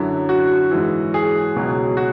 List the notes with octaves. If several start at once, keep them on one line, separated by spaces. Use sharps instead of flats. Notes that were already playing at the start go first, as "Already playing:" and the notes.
Already playing: F#2 D3 F#3 E4
F#4
G#2 E3
G#4
C#2 B2 F#3
F#4